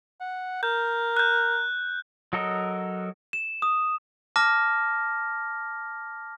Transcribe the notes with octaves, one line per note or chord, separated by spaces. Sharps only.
F#5
A#4 G6
F#6 G6
F#3 F#4 A4 A#4 D#5
E7
D#6
A5 D6 F6 A#6